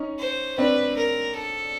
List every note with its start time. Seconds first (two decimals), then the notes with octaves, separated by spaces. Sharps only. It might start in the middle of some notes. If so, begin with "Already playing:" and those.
Already playing: C#4 D#4
0.19 C5
0.58 C4 D4 B4
0.97 A#4
1.35 A4